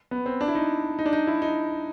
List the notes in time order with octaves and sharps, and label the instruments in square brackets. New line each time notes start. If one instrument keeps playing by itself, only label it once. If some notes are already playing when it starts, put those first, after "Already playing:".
[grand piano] B3
C4
D4
E4
D#4
D#4
D4
D#4
E4
D#4